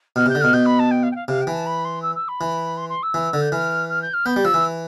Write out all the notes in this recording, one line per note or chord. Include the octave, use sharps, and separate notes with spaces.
B2 F6
C3
G6
D3
B2 F6
B2 G6
B5
A5
G5
F5
G5
F5
C3 F5
G5
E3
A5
B5
C6
E6
E6
B5
E3
C6
C6
E6
E3
D3
G6
E3 F6
F6
G6
F6
B3 G6
G3
F3 E6
E3